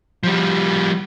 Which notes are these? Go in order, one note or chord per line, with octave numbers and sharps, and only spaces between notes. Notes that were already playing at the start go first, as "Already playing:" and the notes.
F3 G3